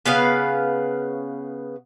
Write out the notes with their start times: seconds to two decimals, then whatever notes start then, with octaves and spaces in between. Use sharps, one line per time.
0.06 C#3 B3 B4 F5